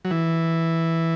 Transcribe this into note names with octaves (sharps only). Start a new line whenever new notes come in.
F#3
E3